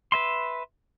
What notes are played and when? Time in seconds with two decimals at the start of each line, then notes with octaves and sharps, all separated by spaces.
0.12 B4 E5 C6